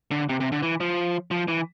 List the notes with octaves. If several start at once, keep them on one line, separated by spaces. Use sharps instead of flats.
D3
C3
C3
D3
E3
F3
F3
E3